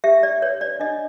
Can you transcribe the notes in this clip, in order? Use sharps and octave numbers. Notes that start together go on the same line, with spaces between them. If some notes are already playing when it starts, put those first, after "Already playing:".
G4 E5
D5
B4 C#5
D5
D4 D#5